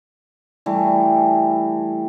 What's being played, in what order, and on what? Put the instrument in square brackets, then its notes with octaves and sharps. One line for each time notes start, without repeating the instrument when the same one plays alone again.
[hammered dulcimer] E3 G3 A3 G4